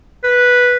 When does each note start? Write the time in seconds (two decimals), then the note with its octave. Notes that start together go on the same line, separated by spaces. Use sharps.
0.24 B4